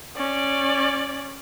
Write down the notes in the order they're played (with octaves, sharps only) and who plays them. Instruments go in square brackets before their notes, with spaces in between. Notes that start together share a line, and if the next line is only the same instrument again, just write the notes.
[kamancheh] C#4 D5